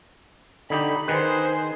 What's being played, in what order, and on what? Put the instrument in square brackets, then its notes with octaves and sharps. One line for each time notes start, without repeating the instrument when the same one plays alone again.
[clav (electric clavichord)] D3 D#4 G4 [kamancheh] B5
[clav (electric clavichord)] D#3 B4 [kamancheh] G#4 C5